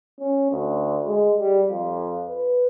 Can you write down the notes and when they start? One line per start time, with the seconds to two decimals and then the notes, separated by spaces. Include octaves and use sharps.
0.20 C#4
0.51 D2
1.07 G#3
1.38 G3
1.68 F2
2.29 B4